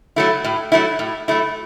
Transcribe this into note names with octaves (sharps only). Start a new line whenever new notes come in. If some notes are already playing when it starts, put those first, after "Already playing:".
F#3 A3 E4
A2
F#3 A3 E4
A2
F#3 A3 E4